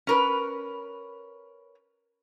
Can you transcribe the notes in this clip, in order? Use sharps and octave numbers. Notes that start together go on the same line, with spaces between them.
C#4 A#4 B4